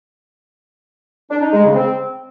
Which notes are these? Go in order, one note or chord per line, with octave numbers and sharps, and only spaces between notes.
D4
D#4
G#3
C#3
C4